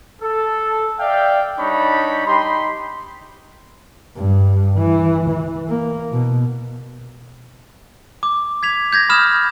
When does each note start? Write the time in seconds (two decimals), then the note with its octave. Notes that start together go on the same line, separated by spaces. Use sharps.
0.22 A4
1.00 D5 E5 F5 G5
1.58 G3 D4 D#4 C#5 B5
2.27 D#4 G4 B5 C6
4.15 G2
4.77 E3
5.29 E3
5.69 A#3
6.12 B2
8.23 D6
8.63 G#6 B6 F7
8.93 G6 G#6 A#6
9.09 B5 D#6 F6 E7